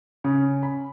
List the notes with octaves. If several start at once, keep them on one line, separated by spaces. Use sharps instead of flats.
C#3
B5